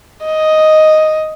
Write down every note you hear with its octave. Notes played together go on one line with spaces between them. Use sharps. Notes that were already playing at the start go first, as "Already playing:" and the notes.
D#5